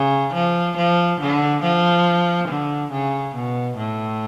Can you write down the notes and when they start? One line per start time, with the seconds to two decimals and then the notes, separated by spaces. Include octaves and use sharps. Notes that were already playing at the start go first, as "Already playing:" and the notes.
Already playing: C#3
0.34 F3
0.77 F3
1.20 D3
1.63 F3
2.48 D3
2.92 C#3
3.35 B2
3.77 A2